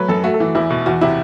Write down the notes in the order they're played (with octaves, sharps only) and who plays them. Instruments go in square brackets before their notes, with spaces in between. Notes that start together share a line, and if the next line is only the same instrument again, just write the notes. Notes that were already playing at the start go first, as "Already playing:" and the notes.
Already playing: [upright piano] F#3 A3 B4
F#2 A4
A3 F#4
A4
E3
E2 E4
B2
E2 F#4
C3 E4